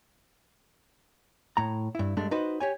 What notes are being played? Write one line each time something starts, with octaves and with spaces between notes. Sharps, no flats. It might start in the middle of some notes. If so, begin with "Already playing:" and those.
A2 A#5
G2 E4
G2 G#3 A3 D4
D#4 F#4 B4 C5
G4 C#5 G#5